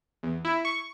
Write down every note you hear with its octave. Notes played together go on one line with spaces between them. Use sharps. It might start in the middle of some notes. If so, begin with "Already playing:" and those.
E2
E4
C#6